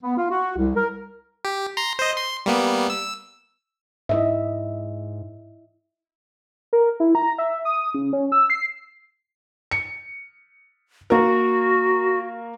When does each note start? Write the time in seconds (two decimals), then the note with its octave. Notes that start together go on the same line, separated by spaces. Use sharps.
0.03 B3
0.18 F4
0.30 F#4
0.57 C2
0.76 A#4
1.45 G4
1.77 A#5 C6
1.99 C5 D#5
2.17 C6
2.46 G3 A#3 B3
2.90 E6
4.09 G#2 E4 D#5 E5
6.73 A#4
7.00 E4
7.15 A#5
7.38 E5
7.65 D#6
7.94 C#3
8.13 C#4
8.32 E6
8.50 C7
9.71 C#7
11.10 A#3 F#4 A#4